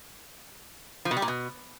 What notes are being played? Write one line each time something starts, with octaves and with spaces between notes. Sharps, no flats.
F3
B2
G3
A#2
B2